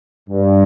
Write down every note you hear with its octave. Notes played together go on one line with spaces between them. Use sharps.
G2